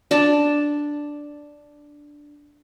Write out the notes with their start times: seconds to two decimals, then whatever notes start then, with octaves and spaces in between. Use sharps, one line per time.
0.11 D4 D5 A5